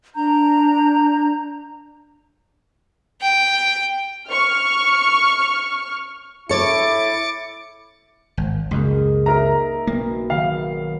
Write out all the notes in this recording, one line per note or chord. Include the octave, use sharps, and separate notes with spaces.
D4 A#5 G6
G5
C#6 F6
E4 A4 C#5 D6 A6 C#7
G#1
C#2 F#2 A#3 G#4 D#5
D#4 A#4 E5 A#5
B1 A#3
D#3 F#3 F5